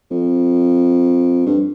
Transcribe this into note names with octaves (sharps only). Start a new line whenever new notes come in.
F2
G2